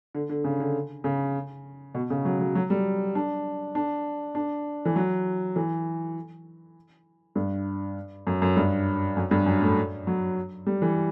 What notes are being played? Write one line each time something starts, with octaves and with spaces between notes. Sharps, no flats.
D3
D3
C#3
D3
C#3
B2
C#3
F#3
F#3
F#3
G3
D4
D4
D4
E3
F#3
E3
G2
F#2
F#2
G2
F#2
G2
F#2
A2
F#3
G3
E3